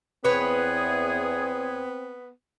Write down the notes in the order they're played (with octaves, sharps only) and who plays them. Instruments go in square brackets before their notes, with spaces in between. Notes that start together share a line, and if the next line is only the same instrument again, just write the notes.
[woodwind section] E2 G#4 [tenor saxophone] B3 [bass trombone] C4 [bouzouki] B4 C#5